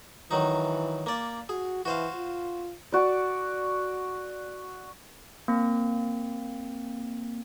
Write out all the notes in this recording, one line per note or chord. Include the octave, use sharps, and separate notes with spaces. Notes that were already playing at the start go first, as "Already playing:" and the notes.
D#3 E3 F#3 D#4
A#3 D5
F#4 G#4
E3 F#4 C5 F5
F4
F#4 D5
A#3 C4